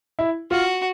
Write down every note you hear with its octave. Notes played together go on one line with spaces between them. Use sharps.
E4
F4 F#4